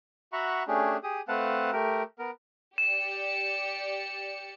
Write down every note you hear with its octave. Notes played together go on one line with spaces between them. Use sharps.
F#4 E5 F#5 A#5 B5 C#6
A3 C#4 D4 G4 G#4
G4 G#4 D#6
A3 C4 B4 F5 F#5 A5
A3 G4 A#4
B3 A#4
G4 D5 C#7 E7